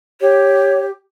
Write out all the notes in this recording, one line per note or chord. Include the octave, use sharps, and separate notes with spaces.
G4 C#5